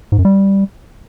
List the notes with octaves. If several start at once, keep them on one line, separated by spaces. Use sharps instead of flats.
G#2
F#2
G3